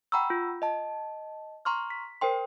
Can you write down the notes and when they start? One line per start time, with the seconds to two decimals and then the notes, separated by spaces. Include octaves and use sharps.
0.12 F#5 G5 A#5 B5 C#6 E6
0.30 F4
0.62 D#5 A5
1.65 A#5 C6 C#6 F6
1.90 B6
2.21 A#4 C5 G5 C6